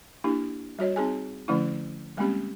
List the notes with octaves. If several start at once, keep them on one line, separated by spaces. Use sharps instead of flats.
A#3 D4 E4 G4
G3 F#4 C#5 D#5
C4 D#4 G#4 G#5
D3 F3 A3 C#4 E4
G3 G#3 A#3 C4 C#4 G4